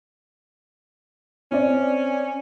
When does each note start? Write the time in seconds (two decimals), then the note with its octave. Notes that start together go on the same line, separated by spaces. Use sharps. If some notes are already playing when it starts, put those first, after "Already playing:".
1.52 C4 C#4 D5